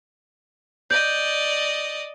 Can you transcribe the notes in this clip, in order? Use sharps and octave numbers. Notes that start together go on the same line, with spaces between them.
D5 D#5 G6